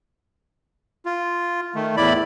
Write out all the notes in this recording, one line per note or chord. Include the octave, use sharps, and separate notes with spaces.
F4
D#3 A3
E2 A2 E4 D5 B5